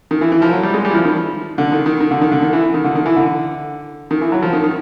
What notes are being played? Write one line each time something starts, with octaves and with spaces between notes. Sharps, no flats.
D#3
E3
E3
F3
F#3
G3
G#3
G3
E3
F3
D#3
D3
D#3
D#3
D#3
D3
D#3
D3
D#3
E3
D#3
D3
D#3
E3
D3
D#3
E3
F#3
F3
D#3
D#3